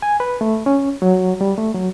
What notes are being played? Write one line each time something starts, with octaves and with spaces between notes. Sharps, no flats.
G#5
B4
A3
C#4
F#3
G3
A3
F#3